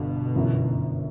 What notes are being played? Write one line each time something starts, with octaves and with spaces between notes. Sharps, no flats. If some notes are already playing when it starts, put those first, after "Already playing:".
Already playing: G1 G2 B2 D3
G1 F#2 E3